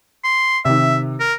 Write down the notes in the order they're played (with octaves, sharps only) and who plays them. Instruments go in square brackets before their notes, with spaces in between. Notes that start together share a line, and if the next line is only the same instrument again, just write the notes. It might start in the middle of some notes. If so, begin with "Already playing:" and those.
[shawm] C6
[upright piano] C3 D#3 [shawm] E5
[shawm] A#4